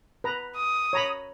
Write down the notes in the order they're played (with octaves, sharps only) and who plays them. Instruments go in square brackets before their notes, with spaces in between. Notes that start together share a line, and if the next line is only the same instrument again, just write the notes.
[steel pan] B4 A#5
[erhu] D#6
[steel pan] C#5 A#5 B5